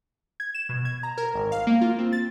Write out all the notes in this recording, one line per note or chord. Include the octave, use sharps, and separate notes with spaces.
G#6
E7
B2
G#6
A#5
A#4
G#1
F5
A#3
F4
C4
A6